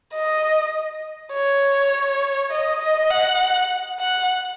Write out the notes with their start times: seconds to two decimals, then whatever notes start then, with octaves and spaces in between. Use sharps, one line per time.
0.15 D#5
1.33 C#5
2.51 D#5
2.82 D#5
3.10 F#5
4.00 F#5